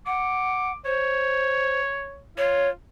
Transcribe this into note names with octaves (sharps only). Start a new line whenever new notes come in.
F#5 D6
C5 C#5
F4 C#5